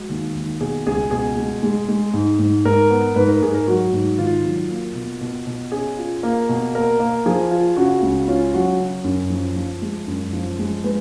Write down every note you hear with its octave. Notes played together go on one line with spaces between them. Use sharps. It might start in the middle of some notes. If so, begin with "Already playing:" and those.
Already playing: G#3 F#4
D#2
D#2
B2 G#4
C#2 G#4
B2 G#4
G#3
G#3
G#3
G#2
G#2
G#2 A#4
B3
G#2 B4
A#4
G#2 G#4
A#4
F#3 F#4
G#2
D#3 F4
F#3
A#3
B2
B2
B2
C#4 G#4
F4
A#3
B2
A#3 A#4
A#3
F3 G#4
F4
C#3 F#4
C#2
C#4 F4
F#3 F#4
C#3
F#2
F3
F3
G#3
F#2
F3
G#3
G#3 B4